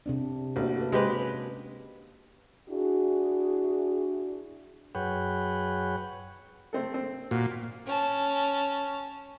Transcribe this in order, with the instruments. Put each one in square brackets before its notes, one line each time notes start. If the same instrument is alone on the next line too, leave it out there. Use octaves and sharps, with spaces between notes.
[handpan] C3 C4 D4
[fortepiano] A1 [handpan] A#3 D4 F#4
[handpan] B4
[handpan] C3 C#4 [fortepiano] G#3 G4 B4
[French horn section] D4 E4 F#4 G#4
[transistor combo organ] F#2 G#4 B4 C#5 F#5 G5
[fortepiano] A3 C4 A4
C4
[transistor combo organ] A#2 [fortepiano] F#4
[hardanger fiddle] C#4 A5